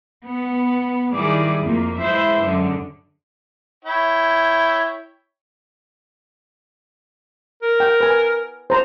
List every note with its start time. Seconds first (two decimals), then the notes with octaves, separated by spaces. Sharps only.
0.24 B3
1.13 D#3 G3 E4 G#4 D5
1.61 F2 A#3
1.98 E3 G#3 E4 C5 E5
2.43 F#2 D3 G#3
3.85 E4 C#5 G5
7.63 A#4
7.80 G5
8.01 B4 G#5
8.70 C5 A#5